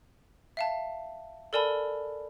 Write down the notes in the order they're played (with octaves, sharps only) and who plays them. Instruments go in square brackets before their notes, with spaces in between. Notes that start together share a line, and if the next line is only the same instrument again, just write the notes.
[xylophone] E5 F5 A5
A4 A#4 D5 G#5 A5 B5